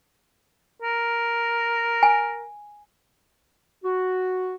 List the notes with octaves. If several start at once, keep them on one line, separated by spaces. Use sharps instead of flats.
A#4
G#5
F#4